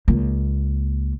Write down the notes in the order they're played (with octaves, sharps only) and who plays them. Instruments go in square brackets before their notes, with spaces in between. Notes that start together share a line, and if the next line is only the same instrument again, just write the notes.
[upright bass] C#2 A#3